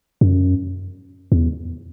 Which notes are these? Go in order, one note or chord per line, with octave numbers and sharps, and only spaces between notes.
F#2
E2